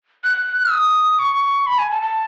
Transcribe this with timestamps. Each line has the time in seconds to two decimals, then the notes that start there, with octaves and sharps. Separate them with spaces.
0.24 F#6
0.72 D#6
1.19 C#6
1.67 B5
1.78 G#5
1.90 A5
2.02 A5